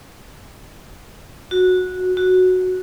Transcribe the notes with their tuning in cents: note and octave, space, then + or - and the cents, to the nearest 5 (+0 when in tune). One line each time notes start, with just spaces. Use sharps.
F#4 -15
F#4 -5